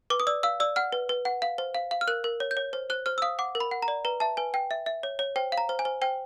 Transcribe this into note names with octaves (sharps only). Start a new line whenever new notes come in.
B4 D6
D#6
D5 E6
F5 E6
D5 E6
F#5 F6
B4
B4
F#5
F5
C5
F5
F5
F6
A#4 F#6
A#4
C#5
G6
C#5
C5
C5 F#6
C5 F6
E6
F5 D#6
F#5 D6
A#4
B5
F#5
A#5
D5
B4 A#5
E5 A5
B4 G#5
G5
E5
E5
C#5
C#5
C5 G5
F5
A#5
C5
G#5
C5
C5 G5